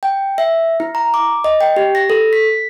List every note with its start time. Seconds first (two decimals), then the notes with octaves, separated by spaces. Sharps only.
0.03 G5
0.38 E5
0.80 E4
0.95 A#5
1.14 D6
1.44 D#5
1.61 G5
1.77 G4
1.95 A#6
2.10 A4
2.33 B6